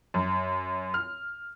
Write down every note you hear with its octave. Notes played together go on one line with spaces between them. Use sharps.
F#2
F6